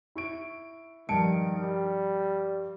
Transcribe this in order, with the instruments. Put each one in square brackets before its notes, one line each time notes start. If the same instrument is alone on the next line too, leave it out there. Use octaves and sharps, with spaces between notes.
[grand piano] E4 C#6 D7
[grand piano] G2 C#7 D7 [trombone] D#3 [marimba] F3 A5
[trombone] G3